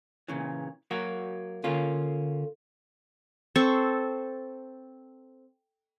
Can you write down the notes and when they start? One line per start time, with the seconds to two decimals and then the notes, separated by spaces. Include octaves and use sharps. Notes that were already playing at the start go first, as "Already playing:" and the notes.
0.28 A#2 C#3 E3
0.91 F#3 A#3 F#4
1.64 D3 A#3 C#4 F4
3.56 C4 A4 C5 C#6